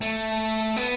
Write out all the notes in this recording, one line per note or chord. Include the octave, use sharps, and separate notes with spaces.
A3
B3